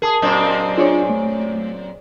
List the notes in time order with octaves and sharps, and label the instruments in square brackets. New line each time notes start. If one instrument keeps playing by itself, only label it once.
[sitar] G#4 [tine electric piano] A#4 A5 D#6
[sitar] F#2 A#2 C4 [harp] D#5
[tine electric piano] D4 F4 [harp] G#4 C#5 D5
[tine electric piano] A3